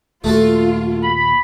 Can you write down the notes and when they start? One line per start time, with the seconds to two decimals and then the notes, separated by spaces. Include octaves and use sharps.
0.24 D#2 A#2 A3 F4 F#4 A4
1.03 B5